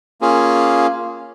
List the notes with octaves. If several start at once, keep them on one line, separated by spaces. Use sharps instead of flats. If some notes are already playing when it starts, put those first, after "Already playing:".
A#3 C#4 F4 G#4